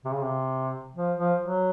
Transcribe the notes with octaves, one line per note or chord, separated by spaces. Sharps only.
C3
C#3
C3
F3
F3
F#3